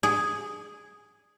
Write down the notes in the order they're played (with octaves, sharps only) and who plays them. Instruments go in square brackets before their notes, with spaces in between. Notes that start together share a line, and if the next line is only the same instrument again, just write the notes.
[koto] G#4